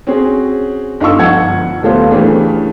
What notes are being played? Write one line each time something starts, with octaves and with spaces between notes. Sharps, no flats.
C4 C#4 F#4 G#4
G1 D#4 F4 A4 C#6 E6
G1 F3 F#5 G#6 C#7
D#1 F#3 A3 B3 F4 C5
C#3 E3 A3 C#4 D4 G4